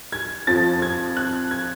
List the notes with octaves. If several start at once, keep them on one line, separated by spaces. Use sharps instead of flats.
G#6
F2 F3 A6
G#6
F#6
G#6